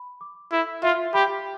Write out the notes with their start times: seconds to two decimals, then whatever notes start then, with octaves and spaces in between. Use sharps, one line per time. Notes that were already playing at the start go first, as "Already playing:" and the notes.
Already playing: B5
0.21 D6
0.52 E4 A4
0.83 F4 E5
1.14 G4 B5